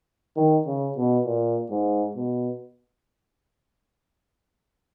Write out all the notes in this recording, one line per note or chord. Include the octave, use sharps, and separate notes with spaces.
D#3
C#3
B2
A#2
G#2
B2